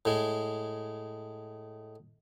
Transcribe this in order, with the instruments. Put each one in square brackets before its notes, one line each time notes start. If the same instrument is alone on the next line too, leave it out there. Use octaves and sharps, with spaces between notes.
[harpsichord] A2 G#3